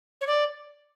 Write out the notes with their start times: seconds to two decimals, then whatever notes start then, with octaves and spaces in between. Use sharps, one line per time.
0.21 C#5
0.27 D5